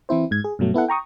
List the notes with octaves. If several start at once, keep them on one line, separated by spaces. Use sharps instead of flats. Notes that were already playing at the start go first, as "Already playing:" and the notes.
E3 C4 E4 C5
G#2 G#6
G#4
G2 B2 F#3 A3
B3 E4 A4 F#5
G5 A#5 C#6 D#6